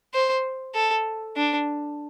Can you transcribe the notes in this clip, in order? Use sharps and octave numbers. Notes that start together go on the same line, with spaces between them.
C5
A4
D4